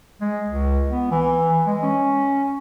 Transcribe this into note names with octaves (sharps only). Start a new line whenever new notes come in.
G#3
C#2
B3
E3
G#3
C#4